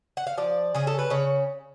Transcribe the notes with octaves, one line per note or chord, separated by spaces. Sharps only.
F#5
F5
F3 D5
C#3 G#4
A4
B4
C#3 C#5